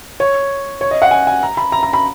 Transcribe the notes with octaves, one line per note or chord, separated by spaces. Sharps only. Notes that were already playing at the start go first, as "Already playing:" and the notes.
C#5
C#5
D#5
F#5
G#5
G#5
A#5
B5
A#5
A#5
B5